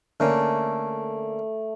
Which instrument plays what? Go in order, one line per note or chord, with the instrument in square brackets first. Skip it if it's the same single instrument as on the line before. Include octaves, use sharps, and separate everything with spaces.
[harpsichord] D3 A#3 C#4 [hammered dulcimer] A3